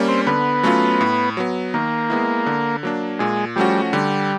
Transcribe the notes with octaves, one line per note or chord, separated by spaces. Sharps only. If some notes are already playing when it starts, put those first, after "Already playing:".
Already playing: G3 A#3 C#4
C4
D3 B3
F#3 A3 C#4 F4
A2
F#3 B3
D#3 A#3
G#3 B3 E4
D3
F#3 A#3 D4
A#2 G#3
F3 G3 A3 C#4 F#4
D3 G3